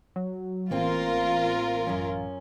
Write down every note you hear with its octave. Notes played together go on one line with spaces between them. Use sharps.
F#3
A1 A#3 C4 F4 A#4
F#2 C#4